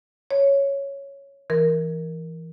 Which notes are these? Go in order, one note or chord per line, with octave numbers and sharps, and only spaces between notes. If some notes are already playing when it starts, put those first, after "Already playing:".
C#5
E3 A#4